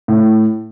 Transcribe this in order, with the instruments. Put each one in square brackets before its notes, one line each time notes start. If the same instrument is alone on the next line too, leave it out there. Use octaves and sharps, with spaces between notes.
[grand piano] A2